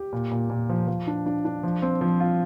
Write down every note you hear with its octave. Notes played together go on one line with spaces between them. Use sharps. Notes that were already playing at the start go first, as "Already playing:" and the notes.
Already playing: G4
A#2
A#2
A#2
F3
F3
D4
D4
D4
F3
C4
F3
F4